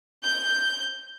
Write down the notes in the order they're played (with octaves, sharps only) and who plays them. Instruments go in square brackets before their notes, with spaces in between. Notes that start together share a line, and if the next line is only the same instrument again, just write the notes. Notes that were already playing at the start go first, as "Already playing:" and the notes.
[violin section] G6